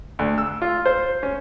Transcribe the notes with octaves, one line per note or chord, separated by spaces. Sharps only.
D2
E6
F4
C5
C#4